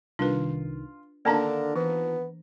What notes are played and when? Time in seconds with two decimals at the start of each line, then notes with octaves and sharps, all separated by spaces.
0.19 C2 D#3 D4 F4 B4
1.25 D3 D#3 A#3 D4 F4 A#4 A5 A#5
1.76 E3 B3